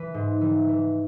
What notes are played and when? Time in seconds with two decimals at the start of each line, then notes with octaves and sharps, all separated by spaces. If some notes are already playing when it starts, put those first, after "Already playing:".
Already playing: E3 B4
0.14 G#2
0.41 E3
0.68 E3